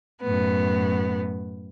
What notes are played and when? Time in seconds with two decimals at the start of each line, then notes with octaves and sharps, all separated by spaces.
0.21 F#2 A2 B3